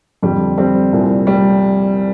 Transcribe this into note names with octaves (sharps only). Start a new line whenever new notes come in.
F2 D3 G3
G3 C4
C2 A#2
G3